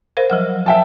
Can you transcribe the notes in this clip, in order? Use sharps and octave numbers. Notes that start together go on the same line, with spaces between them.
A#4 C5 F5
F3 F#3 F#5
E5 G5 A5